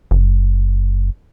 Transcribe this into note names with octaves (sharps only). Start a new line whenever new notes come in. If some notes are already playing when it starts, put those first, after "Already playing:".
F#1